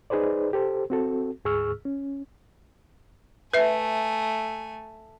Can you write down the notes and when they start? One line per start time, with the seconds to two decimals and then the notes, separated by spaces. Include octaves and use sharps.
0.10 D#4 G#4 B4 C5 D5
0.53 G4 A4 C5
0.90 C4 F#4 A4
1.45 D2 G#2 G#4 C#6 E6 F6
1.85 C#4
3.54 A3 B4 E5 G#5